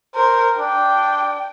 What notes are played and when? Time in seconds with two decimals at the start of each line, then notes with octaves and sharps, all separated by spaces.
0.15 A#4 C5
0.58 D4 G5